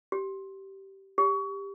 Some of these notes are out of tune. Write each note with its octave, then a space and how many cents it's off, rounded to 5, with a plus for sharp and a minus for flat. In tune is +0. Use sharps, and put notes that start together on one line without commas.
G4 -15
G4 +15